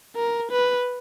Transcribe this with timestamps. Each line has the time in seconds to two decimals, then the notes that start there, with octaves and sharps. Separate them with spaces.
0.16 A#4
0.51 B4